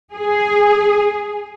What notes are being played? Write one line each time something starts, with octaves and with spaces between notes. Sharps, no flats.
G#4